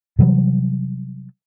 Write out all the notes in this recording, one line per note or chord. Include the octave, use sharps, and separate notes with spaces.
C3 E3 F#3 G3